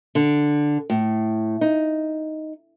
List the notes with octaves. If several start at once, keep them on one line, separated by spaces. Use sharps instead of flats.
D3
A2
D#4